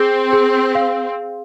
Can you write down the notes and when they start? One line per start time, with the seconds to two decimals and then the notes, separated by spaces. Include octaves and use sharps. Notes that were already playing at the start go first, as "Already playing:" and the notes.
Already playing: C4 G#4
0.33 G#4
0.75 F5